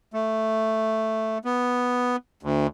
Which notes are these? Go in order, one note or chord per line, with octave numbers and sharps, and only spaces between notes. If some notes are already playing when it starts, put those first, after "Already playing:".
A3
B3
D2